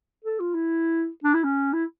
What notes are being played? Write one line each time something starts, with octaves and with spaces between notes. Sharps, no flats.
A4
F4
E4
D4
E4
C#4
E4